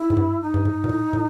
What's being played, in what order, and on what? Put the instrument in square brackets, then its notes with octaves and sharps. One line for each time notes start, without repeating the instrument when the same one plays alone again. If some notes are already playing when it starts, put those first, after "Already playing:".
Already playing: [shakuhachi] E4
[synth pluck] G#2
G2
[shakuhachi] D#4
[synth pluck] G2
G#2
A#2
A2
A2